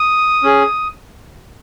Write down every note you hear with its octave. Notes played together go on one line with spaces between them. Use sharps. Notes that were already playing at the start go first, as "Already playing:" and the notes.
Already playing: D#6
C#4 G#4